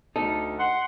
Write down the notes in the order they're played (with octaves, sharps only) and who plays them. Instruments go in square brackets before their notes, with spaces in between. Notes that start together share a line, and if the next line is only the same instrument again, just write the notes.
[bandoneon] D2 [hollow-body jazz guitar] D#4 A4
[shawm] F#5 [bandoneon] C6